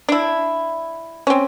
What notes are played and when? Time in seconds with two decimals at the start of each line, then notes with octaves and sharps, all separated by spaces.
0.09 D4 E4
1.27 C4 C#4